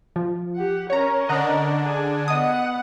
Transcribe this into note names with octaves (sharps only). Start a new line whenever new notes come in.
F3
G4 F#5
C#4 A#4 C#5 A#5
D3 D4 D#5 F#5 A#5
G#4 G#5
B3 D#5 F#5 D#6